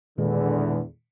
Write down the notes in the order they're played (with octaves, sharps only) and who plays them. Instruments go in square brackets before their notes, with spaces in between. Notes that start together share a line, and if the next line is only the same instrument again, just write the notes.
[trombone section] E2 D3 [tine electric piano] A#2 D#3 G#3